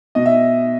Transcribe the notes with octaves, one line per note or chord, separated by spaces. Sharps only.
B2 D#5
E5